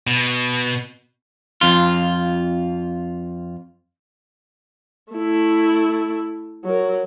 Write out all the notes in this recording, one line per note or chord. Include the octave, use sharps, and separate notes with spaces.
B2
F2 F4
A3 E4
F#3 A#4